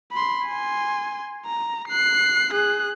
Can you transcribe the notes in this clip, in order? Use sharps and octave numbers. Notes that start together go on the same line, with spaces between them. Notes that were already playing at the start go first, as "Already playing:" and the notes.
B5 C6
G#5 C6
A#5
F#6 C7
G#4 F#6